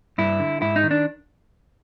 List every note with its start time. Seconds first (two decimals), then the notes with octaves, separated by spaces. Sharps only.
0.18 G2 E4
0.39 D3
0.62 G#2 E4
0.76 D#4
0.83 D#3
0.91 D4